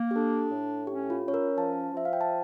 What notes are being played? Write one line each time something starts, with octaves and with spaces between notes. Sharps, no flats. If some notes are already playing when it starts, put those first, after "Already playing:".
Already playing: A#3
G4
D4 A4
A2
C#4 G4
F4
C#4
C#5
A#4
F3 A5
F3 E5
F5
G5
A5